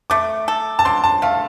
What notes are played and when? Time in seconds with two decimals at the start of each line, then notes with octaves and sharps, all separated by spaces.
0.10 A3 D6
0.48 A4
0.79 A5
0.85 D3 C6
1.04 A5
1.22 A3 F5